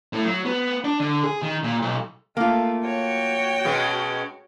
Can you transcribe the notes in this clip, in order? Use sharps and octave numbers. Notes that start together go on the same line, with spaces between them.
A2
F#3
B3
D4
D3
G#4
D#3
A#2
B1
A3 A#3 F4
F#4 C#5 G5
B2 G#3 C#4